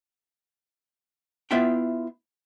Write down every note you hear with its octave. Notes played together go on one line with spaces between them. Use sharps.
B3 E4 F4 E5 G5